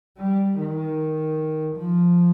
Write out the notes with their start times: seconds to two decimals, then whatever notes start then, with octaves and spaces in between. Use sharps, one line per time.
0.18 G3
0.58 D#3
1.76 F3